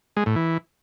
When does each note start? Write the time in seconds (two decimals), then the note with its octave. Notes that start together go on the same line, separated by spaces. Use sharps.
0.17 G#3
0.26 A2
0.36 E3